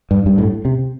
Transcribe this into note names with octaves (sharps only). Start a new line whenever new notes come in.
G2
G2
A2
C3